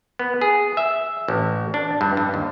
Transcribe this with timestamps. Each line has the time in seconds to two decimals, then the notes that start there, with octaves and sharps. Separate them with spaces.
0.19 B3
0.41 G#4
0.77 E5
1.28 A1
1.74 D4
2.01 G2
2.17 G2
2.34 D#2